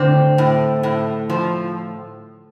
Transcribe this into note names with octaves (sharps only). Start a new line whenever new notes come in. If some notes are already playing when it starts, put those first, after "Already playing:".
Already playing: A2 D3 C4 D4
A2
A2
F3